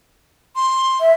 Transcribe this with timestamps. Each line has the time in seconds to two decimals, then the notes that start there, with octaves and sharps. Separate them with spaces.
0.56 C6
1.00 E5